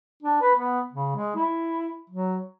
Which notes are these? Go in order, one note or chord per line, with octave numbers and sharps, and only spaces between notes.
D4
B4
B3
C#3
G#3
E4
F#3